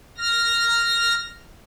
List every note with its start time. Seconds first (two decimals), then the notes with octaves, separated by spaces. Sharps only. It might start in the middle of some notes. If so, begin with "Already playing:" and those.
0.18 F6 A#6